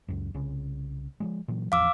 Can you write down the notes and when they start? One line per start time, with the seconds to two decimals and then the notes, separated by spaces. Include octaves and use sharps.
0.08 C#2 F#2
0.34 C2 C#3
1.20 F3 F#3 G#3
1.48 A#2 E3 F#3
1.72 A1 E2 F3 F5 D6 E6